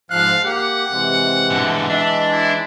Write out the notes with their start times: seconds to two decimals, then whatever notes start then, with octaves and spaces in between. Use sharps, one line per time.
0.10 G#2 F3 F5 F#6
0.44 A#3 G4 F#5
0.91 C3 E3 G#3
1.51 B2 D3
1.89 D4 D#5 E5
2.31 E4